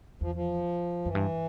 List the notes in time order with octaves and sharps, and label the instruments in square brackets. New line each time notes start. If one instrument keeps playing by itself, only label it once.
[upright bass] E2 [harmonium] F3
[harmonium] F3
[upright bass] F#2 [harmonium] E3
[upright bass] G2